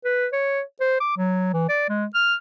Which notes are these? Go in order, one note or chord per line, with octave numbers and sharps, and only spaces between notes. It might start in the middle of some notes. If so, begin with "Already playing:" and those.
B4
C#5
C5
D6
F#3
E3
D5
G#3
F6